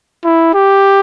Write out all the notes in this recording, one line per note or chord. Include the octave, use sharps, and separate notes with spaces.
E4
G4